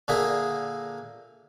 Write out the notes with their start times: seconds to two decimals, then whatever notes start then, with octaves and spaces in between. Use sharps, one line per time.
0.08 A#2 D3 A#3 G#4 E5